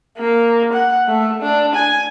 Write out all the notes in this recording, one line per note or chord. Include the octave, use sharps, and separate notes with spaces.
A#3
F#5
A3
D4
G#5